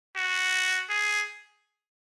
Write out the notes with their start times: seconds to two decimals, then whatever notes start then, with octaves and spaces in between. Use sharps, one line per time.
0.16 F#4
0.89 G#4